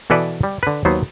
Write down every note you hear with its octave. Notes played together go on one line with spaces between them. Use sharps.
B2 E3 A4 B4 D5
G3
D3 B4
D#2 F#3 B3 C5